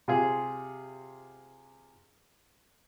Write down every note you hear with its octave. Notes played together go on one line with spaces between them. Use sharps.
C3 F4 G#4